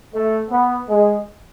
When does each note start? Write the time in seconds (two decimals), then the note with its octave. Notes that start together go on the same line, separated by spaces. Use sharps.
0.13 A3
0.50 B3
0.89 G#3